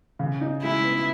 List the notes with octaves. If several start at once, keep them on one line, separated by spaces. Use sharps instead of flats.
C#3
D#4
G#3 E4
B3